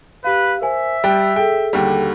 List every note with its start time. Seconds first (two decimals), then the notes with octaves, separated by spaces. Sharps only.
0.24 G4 B4 F5
0.61 A#4 C5 E5 G#5
1.04 G3 G5 E6 F#6 A6
1.36 G#4 A4 G5
1.73 D#2 D3 G3